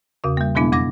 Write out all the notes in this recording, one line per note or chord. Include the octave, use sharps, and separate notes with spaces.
E2 C#3 F#4
G3 A#3
B2 F#3 G#3 B3 D4 E4
F2 D6 A#6